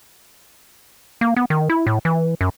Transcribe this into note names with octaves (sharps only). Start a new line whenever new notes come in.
A#3
B3
D#3
E4
A2
E3
F#2